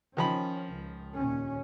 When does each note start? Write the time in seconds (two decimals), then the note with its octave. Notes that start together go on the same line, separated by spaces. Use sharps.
0.17 D#3 F3 C#4 B5
0.72 C#2
1.17 D#2 A#2 C#4